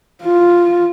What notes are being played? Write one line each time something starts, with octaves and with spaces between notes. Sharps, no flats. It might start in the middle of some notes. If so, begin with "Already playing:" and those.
F4